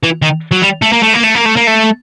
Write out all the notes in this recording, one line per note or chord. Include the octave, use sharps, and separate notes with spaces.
E3
D#3
F#3
G3
A3
A#3
A3
A#3
A3
A#3
A3
A#3
A3